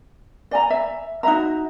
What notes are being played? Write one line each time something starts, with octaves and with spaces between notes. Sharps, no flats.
D5 G#5 A#5
E5
D#4 F#4 E5 A#5